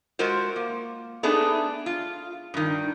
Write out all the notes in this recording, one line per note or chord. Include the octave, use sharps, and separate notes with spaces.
G#3 F4 F#4 A#4 C5
A#3
A3 B3 D4 D#4 G#4
F4
G2 D#3